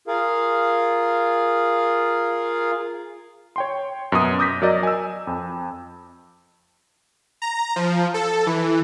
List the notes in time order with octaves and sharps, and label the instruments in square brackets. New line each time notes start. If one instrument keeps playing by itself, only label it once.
[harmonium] F4 G#4 A#4 F5
[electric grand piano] C#5 G5 C6
F#2 B2 D#6
D6 D#6 G6 A#6 B6
F#3 A#4 D5 D#5
G#5 E6
F2
[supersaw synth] A#5
F3
A4
E3